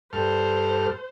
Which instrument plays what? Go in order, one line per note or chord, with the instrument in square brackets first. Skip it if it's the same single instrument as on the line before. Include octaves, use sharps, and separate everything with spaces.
[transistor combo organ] G2 A4 F6 [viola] C5